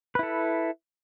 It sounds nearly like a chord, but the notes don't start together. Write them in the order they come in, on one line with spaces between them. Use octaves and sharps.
B4 E4 A4